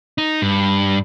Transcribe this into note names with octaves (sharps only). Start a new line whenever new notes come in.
D#4
G2